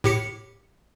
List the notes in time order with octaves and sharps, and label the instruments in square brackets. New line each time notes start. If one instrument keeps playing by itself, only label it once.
[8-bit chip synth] A2 G4 C#7